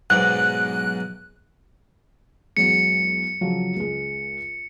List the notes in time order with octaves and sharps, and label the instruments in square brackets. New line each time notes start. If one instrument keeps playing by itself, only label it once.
[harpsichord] B1 G#2 [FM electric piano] F#6
[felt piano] E2 F#3 G#3 [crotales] C#7
[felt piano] C#3 F3 F#3
C#2 G#3